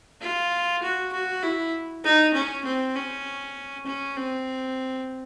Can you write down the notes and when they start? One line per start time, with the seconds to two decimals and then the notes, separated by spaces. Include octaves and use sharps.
0.21 F4
0.82 F#4
1.13 F#4
1.43 E4
2.04 D#4
2.34 C#4
2.65 C4
2.95 C#4
3.86 C#4
4.17 C4